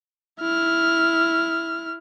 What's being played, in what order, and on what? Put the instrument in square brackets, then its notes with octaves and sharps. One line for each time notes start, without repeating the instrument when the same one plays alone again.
[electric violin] E4 F6